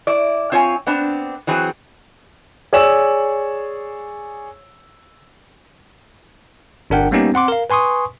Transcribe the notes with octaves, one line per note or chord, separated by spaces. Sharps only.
E4 D5
C4 F4 C#5 F#5 G#5
B3 C4 D4
E3 F#3 C4 G#4
G#4 C#5 D5 E6 E7 F#7
G1 D4 A#4 F#5 G5
G3 A#3 B3 C#4 D#4 G4
C4 F#5 C6 D6
A#4 F5
B4 G#5 C6 C#6 D#6